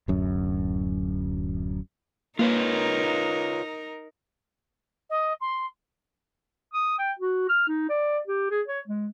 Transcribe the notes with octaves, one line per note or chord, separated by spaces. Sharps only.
D1 F#2
A#3 D#4 F4 A#4 B4 C#5
D#5
C6
D#6
G5
F#4
F6
D#4
D5
G4
G#4
C#5
G#3